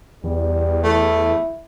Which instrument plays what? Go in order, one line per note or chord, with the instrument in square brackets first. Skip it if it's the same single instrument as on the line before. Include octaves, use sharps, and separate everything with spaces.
[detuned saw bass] E2 [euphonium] G3
[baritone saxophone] A3 [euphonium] E4